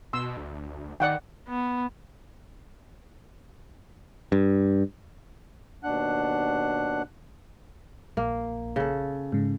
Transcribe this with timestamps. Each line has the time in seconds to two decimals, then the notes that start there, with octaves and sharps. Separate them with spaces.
0.13 B2 C6 E6
0.37 D2
1.00 D#3 D5 F#5 G5
1.48 B3
4.32 G2
5.84 D#2 B2 D4 F#5 F#6
8.17 A#1 A#3
8.76 C#3 A4
9.32 G#2 C#3